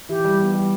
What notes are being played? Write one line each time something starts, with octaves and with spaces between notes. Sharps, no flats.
E3 G4
G3
B3
G3